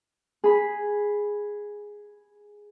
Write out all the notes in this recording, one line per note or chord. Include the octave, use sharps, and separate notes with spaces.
G#4 B5